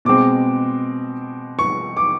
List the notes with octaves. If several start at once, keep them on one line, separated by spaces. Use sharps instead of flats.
B2 G#3 C4 D6
C#6
D6